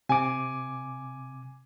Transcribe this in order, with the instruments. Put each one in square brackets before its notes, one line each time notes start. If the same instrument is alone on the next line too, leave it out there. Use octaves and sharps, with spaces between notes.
[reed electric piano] C3 D6 [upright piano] G#5